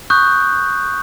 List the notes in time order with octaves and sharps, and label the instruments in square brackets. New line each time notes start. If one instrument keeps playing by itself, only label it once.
[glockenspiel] C#6 D#6 F#6 G6